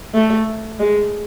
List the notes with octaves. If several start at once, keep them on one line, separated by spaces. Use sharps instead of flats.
A3
G#3